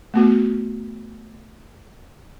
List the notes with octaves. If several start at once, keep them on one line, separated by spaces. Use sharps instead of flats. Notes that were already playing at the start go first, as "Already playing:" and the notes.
A3 B3 F#4